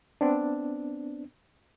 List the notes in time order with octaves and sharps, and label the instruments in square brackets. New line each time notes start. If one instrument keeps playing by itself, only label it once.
[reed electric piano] B3 C4 D4